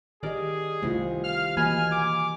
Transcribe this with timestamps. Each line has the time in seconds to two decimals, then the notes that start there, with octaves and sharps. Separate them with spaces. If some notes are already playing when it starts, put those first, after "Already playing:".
0.23 D#3 G4 G#4 A#4 D5 D#5
0.83 C2 D#3 A3 E4 F4
1.24 F5 F6
1.57 E3 A#3 F#4 D#5 G#5 B5 F6
1.92 D6